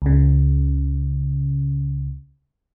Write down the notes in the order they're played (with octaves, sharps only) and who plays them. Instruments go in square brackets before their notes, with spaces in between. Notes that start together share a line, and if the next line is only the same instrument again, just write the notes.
[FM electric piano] C#2 C#3